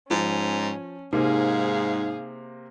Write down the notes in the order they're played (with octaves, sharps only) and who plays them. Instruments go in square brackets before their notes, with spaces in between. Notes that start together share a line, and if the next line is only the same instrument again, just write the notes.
[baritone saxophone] G#2 [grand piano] F3 [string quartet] C#4
[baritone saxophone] G#2 [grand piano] C3 A#3 [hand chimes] D#4 [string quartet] G#4 F5